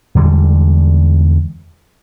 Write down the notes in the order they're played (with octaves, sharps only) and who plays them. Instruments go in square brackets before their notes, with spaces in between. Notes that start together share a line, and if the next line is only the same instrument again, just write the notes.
[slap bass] E2 D3 G3 G#3